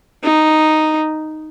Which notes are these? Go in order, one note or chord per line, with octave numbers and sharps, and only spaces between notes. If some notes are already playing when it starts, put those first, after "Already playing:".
D#4